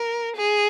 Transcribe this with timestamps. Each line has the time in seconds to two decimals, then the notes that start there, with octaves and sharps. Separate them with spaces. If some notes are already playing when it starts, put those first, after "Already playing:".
Already playing: A#4
0.37 G#4